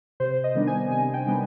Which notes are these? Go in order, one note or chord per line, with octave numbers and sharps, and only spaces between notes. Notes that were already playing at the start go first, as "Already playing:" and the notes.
C3 C5
D#5
D#3 G3 B3 D4
G#5
C3 G#5
G5
D#3 G3 B3 D4